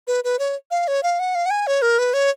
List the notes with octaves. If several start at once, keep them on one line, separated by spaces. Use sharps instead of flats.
B4
B4
C#5
F5
C#5
F5
F#5
F5
F#5
G#5
C#5
A#4
B4
C#5